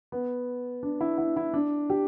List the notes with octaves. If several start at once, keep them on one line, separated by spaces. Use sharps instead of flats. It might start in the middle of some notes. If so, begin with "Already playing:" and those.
B3
D4
E4
E4
E4
D4
G4